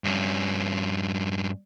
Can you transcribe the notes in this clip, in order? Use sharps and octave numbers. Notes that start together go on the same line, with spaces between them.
G2 C#4